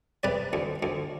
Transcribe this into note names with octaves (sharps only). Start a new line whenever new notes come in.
C3 B4 D5
D2
D2